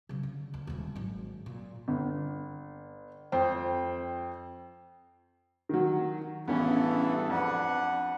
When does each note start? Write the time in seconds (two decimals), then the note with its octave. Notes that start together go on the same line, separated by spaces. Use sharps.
0.09 C#3 F#3
0.23 D3
0.54 D2
0.67 D#1 D#3
0.95 G#1 F#3
1.46 A#2
1.88 G1
3.32 F2 C5 G5
5.69 D#3 F#3
6.48 A1 G2 E3 B3 C#4 G#4 A4
7.30 F2 D4 B4 F#5